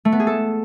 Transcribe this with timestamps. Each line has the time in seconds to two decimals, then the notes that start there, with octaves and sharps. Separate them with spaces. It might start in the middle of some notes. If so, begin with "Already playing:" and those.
0.05 A3
0.12 B3
0.20 G#4
0.27 A4